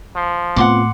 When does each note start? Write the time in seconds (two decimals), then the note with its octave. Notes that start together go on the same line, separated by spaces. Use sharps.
0.15 F3
0.56 A2 B3 C4 F4 F#5 C6 D6